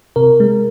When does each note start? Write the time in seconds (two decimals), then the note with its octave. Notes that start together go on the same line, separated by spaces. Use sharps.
0.16 C3 A#4
0.40 G#3